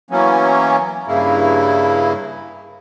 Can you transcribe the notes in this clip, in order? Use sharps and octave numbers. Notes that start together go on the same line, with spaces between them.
E3 F#3 A#3 B3 C#4
G2 C#3 A#3 E4